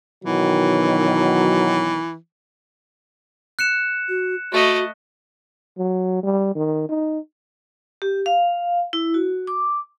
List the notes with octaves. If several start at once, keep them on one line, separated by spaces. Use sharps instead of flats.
B2 D#3 E3 F#3
F#6 C#7 E7
F#4
A3 F#4 D#5
F#3
G3
D#3
D#4
G4
F5
E4
F#4
D6